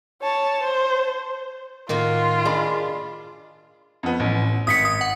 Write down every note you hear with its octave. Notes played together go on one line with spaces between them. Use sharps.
C#5 A5
C5
A2 D#3 A#3 F4 F#4
D4 G#4 D#5 B5
F2 B3
A1
G#1 D#6 B6 C#7
D#6
F#5